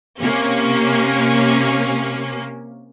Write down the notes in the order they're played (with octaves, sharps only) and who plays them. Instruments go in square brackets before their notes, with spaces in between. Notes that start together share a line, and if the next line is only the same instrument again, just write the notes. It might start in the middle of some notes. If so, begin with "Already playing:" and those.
[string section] C3 A#3 C#4